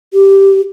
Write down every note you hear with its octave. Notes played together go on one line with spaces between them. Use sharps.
G4